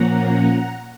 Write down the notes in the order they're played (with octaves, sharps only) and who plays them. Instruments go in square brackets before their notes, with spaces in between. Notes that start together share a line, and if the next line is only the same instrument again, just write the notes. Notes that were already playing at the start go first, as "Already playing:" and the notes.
Already playing: [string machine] A#2 F3 A#3 C#4 F#5 A#5